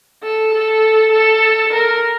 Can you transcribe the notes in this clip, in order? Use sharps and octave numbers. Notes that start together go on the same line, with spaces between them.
A4
A4
A4
A#4